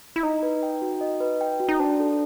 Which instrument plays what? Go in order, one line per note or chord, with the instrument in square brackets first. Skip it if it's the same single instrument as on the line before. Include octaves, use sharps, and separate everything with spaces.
[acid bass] E4
[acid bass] D#4 [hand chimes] D#5
[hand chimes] B4
G5
F#4
D#5
B4
G5
F#4
[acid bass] D#4
[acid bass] D4 [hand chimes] C5
[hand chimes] A4